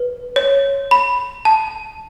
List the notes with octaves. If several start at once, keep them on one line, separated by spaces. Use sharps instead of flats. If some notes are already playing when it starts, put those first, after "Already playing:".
Already playing: B4
C#5
B5
A5